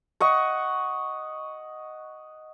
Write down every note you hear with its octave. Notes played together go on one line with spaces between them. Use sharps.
D#5 F#5 C#6